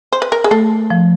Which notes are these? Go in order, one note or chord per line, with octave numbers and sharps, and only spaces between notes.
C5
B4
A#4
G#4
A3 A4
F3